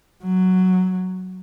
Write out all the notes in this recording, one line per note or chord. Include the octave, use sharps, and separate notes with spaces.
F#3